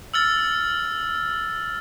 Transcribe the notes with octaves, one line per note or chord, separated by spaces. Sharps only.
E6 F6 A6